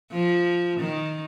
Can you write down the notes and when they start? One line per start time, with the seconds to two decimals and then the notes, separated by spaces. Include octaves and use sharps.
0.12 F3
0.80 D#3